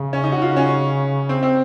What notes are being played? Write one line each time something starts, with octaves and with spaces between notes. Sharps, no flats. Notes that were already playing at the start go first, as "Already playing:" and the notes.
Already playing: C#3
C#4
D#4
F#4
C#3 F4
C#4
C4
C4